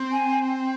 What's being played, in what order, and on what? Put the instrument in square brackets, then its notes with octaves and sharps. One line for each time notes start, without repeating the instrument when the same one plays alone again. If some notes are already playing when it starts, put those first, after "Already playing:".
Already playing: [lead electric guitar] C4
[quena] G#5